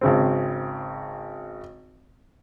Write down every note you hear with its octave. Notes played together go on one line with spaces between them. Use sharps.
G#1 C#3 C4